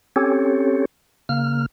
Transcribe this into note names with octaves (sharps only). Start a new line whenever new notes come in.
C4 C#4 G4 A4 C#5
C#3 A#3 F6